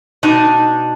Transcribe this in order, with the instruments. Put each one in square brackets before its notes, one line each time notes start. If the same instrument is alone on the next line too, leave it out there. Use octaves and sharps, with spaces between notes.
[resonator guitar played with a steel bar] B2 D4 D#4